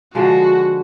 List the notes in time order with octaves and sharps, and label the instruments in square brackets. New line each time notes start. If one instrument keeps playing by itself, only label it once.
[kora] D3 F3 G#3 [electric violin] F#4